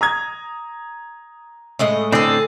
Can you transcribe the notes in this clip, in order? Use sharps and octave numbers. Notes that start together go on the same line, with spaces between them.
A#5 D#6 G#6
A2 G#3 D#5
A2 D3 C4 G#4 A4